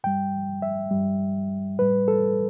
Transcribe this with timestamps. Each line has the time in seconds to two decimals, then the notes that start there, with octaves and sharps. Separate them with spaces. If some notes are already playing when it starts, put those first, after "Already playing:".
0.04 G2 G3 G5
0.62 E5
0.91 G2 G3
1.79 A2 G3 B4
2.08 A4